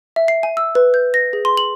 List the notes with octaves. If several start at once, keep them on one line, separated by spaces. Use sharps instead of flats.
E5
C7
G#5
E6
B4
G6
A#6
G#4
C6
F#7